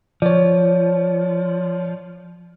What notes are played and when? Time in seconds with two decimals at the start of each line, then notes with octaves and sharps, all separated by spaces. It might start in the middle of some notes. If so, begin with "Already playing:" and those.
0.22 F3 C#5 D5